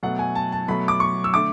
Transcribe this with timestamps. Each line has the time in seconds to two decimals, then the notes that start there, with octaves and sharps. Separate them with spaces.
0.03 B2 F#3 A3 F#5
0.19 G#5
0.35 A5
0.52 A5
0.68 B2 F#3 A3 B5
0.88 D6
1.00 C#6
1.24 E6
1.33 D3 A3 D6